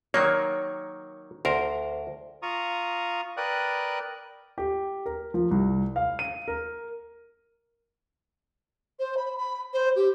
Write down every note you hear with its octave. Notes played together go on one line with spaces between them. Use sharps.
D#3 F#3 A#3 C#5
D2 A#4 C5
F4 A#5 C#6 D#6
A#4 B4 D5 G5 D#6 F#6
G4
A#4
F3
C2
F5
D#7
A#4
C5
B5
B5
C5
G4